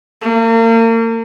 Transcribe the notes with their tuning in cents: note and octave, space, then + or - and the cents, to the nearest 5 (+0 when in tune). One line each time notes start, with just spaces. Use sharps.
A#3 -40